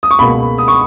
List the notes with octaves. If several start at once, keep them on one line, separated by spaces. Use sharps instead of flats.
D#6
C#6
C#2 B2 A#3 B5
D#6
C#6